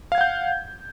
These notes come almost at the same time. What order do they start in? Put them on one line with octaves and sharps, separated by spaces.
F5 G#6 F#5 G6